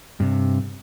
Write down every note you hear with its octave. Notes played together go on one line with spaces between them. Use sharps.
G2 C3